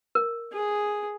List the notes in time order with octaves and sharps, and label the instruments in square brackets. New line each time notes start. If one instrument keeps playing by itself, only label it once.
[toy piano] A#4
[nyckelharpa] G#4